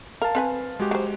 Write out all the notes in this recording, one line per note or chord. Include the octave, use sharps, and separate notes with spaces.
A#4 F5 A5
C4 B4 G#5
G#3 F#4 G4
F#3 C5